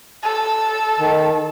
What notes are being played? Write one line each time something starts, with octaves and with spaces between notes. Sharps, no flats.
A4
D#3